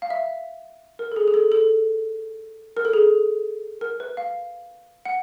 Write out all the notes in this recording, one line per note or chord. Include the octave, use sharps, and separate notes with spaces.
F5
E5
A#4
A4
G#4
G#4
A4
A4
A#4
A4
G#4
A#4
B4
F5
F#5